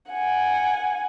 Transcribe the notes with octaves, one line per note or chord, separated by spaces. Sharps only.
F#5 G#5